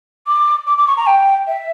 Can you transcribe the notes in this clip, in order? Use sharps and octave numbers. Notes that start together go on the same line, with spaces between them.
D6
D6
D6
C#6
A#5
G5
E5